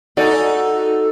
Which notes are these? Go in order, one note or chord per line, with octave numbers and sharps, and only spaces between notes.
D#4 F#4 A4 D5 G#5